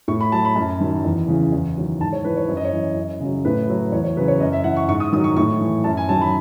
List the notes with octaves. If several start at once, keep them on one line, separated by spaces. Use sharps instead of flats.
A2 C#6
B5
F#3 A5
B5
F#2 A5
D#3 F#3
E2
C#3 E3
E2
D#3 F#3
G#2 A5
C#5
E3 B4
C#5
F#2 C#5
D#5
C#5
E3
F#2
C#3 F#3
A2 B4
F#3
E2 C#5
C#5
C#3 F#3 B4
C#5
F#2 D#5
E5
E3 F#5
C#6
G#2 C#6
D#6
D#3 F#3 D#6
C#6
A2 C#6
E3
F#2 A5
G#5
D#3 F#3 A5
B5